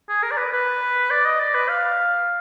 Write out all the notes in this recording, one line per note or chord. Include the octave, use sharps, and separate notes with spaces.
G#4
A#4
D5
B4
B4
D5
D#5
D5
B4
F5